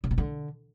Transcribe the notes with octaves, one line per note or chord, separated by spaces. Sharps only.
C#3
B2
D3